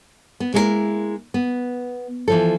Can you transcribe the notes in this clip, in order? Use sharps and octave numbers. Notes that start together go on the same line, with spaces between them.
B3
G#3 A#3 E4 F#4 A#4
B3
E3 F3 A4